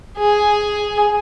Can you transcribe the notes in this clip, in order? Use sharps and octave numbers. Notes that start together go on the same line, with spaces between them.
G#4